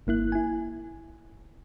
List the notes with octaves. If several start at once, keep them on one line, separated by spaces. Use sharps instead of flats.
G1 A#3 E4 F#6
E4 G#5